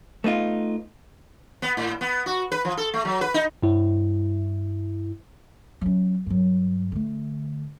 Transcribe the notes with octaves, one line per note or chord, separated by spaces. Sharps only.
A3 B3 D#4 F4
B3
A2
B3
F#4
B4
F3
A4
A3
F#3
B4
D#4
G2 E4
F#3 C#4
G2 F#3
D3 A3